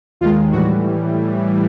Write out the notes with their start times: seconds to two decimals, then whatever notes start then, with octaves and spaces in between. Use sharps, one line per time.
0.21 D#2 D#3 G#3 F4
0.52 A2 E3 G3 F#4